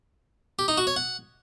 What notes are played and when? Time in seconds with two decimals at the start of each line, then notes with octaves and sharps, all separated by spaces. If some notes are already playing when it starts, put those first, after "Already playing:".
0.59 G4
0.68 D#4
0.78 F#4
0.87 C#5
0.96 F#5